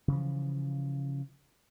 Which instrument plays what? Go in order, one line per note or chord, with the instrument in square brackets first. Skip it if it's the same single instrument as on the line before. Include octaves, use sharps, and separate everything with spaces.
[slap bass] C#3 E3 F3